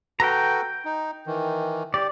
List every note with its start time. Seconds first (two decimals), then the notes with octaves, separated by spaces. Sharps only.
0.20 F#4 A4 B4 G5 A#5
0.85 D#4
1.26 D#3 E3
1.94 G4 D5